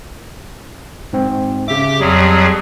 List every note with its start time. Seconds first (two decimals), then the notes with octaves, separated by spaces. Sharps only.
1.13 G#2 C4
1.68 C#3 G4 E5 D6
2.00 F2 F#3 G3 G#4